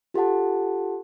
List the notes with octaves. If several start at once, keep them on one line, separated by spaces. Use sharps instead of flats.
F4 G4 A4 F#5 A5